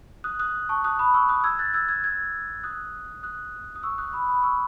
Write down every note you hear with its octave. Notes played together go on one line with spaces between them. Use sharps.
D#6 F#6
D#6 F#6
A5 C#6
D#6 F#6
B5 D#6
C#6 E6
D#6 F#6
E6 G#6
F#6 A6
E6 G#6
E6 G#6
E6 G#6
D#6 F#6
D#6 F#6
D#6
C#6 E6
D#6 F#6
B5 D#6
B5 D#6
C#6 E6